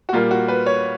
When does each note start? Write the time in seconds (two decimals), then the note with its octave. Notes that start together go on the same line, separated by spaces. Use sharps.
0.09 F#4
0.13 A#2 G3 A#3 F4
0.31 F#4
0.48 B4
0.66 C#5